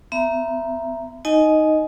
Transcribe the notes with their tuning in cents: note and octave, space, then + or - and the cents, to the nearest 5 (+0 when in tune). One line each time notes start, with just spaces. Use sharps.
B3 +35 E5 +20 A#5 +0
D#4 +0 D#5 +0 G#5 +25